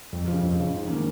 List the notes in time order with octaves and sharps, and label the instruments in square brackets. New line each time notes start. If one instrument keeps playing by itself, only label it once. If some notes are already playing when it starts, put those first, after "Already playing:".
[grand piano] F2
C#3 F3
F2
C#3 F3
G#2
D#3 A#3 C#4